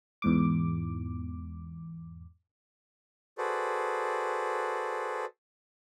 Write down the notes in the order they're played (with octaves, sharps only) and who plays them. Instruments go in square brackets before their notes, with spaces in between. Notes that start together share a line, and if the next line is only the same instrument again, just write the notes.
[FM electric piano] E2 G#2 D6
[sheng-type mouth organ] F#4 G#4 A4 B4 C5 D5